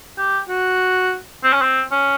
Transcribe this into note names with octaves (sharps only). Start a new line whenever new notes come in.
G4
F#4
C4
C#4
C4
C#4